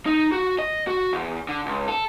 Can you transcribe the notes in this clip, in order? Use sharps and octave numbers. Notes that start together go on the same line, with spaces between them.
D#4
F#4
D#5
F#4
E2
D3
C#2
A4